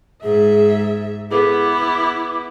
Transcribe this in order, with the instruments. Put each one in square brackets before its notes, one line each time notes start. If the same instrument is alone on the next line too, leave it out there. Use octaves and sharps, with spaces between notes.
[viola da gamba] G#2 [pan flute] G#4 [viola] E5
[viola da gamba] B3 [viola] E4 [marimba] G#4 A4 B4 [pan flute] D6